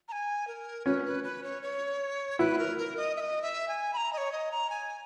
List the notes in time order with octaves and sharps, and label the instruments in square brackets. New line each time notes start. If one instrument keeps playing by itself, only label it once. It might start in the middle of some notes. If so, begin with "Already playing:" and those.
[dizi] A#5
G#5
A#4
[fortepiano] C#4 [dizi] B4
[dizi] B4
B4
C#5
C#5
[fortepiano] E4 [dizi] B4
[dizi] A#4
A#4
D#5
E5
D#5
E5
G#5
B5
A#5
D#5
C#5
D#5
A#5
G#5